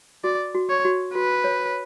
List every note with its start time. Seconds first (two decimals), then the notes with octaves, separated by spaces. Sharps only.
0.24 F#4 D5
0.55 F#4
0.70 C#5
0.85 F#4
1.15 F#4 B4
1.44 C#5